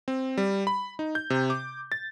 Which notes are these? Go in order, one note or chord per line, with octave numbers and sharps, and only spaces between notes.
C4
G3
B5
D#4
G6
C3
D6
A6